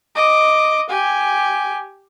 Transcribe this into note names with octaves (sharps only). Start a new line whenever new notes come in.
D#5 D6
G4 G#5